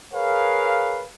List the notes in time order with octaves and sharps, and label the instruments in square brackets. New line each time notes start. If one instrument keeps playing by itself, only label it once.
[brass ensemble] G#4 A#4 B4 C#5 F5